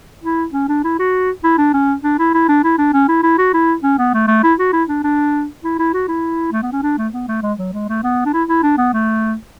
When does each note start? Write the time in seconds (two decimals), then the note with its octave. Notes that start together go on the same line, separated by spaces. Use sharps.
0.24 E4
0.53 C#4
0.69 D4
0.84 E4
0.99 F#4
1.44 E4
1.58 D4
1.73 C#4
2.04 D4
2.19 E4
2.34 E4
2.49 D4
2.64 E4
2.78 D4
2.93 C#4
3.09 E4
3.23 E4
3.38 F#4
3.54 E4
3.83 C#4
3.98 B3
4.14 A3
4.28 A3
4.43 E4
4.59 F#4
4.73 E4
4.89 D4
5.04 D4
5.64 E4
5.79 E4
5.93 F#4
6.08 E4
6.52 A3
6.62 B3
6.72 C#4
6.83 D4
6.98 A3
7.13 B3
7.28 A3
7.43 G#3
7.59 F#3
7.73 G#3
7.89 A3
8.03 B3
8.25 D4
8.33 E4
8.49 E4
8.63 D4
8.77 B3
8.93 A3